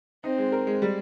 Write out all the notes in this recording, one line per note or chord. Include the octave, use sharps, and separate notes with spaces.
C4 D#4
G#3
A#4
G#3
G3